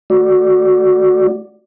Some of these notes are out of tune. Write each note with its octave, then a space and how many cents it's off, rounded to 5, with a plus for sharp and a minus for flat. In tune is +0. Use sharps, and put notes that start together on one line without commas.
A3 +0 F#4 +0 D5 +0